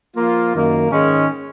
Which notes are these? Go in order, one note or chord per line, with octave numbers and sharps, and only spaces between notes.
F3 A#3 F4
F#2 D#3 A#3
G#2 D#3 G#3 C#4